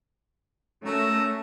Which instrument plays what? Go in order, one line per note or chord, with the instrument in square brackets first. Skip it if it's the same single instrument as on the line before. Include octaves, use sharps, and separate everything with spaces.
[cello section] A3 C#4 [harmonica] F#4 A#4 E6